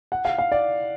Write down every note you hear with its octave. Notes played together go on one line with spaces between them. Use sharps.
F#5
F5
F5
D5